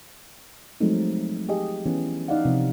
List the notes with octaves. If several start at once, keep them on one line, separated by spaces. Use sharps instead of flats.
F3 F#3 G#3 A3 C4 D#4
G4 G#4 D#5
E3 B3 C#4
D#4 D5 D#5 F5 F#5
C3 F3